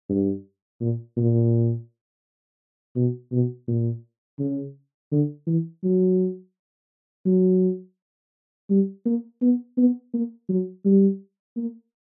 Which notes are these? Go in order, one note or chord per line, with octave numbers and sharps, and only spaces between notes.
G2
A#2
A#2
B2
B2
A#2
C#3
D3
E3
F#3
F#3
G3
A#3
B3
B3
A#3
F#3
G3
A#3